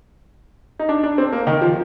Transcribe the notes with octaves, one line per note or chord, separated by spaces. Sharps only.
D#4
D4
D4
C4
A#3
D#3
F3